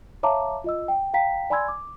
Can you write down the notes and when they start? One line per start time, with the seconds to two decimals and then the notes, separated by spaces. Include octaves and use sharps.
0.23 C#5 E5 F5 A5 A#5 D6
0.64 F4 D#5 E6
0.88 G5
1.14 F5 G5 A#5 B6
1.50 D5 G#5 B5 C6 E6 G#6
1.68 D6